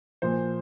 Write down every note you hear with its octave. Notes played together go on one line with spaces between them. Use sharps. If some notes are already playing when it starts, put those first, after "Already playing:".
A#2 F3 C5